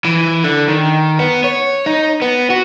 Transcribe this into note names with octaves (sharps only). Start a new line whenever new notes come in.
E3
D3
D#3
B3
C#5
D#4
B3
F#4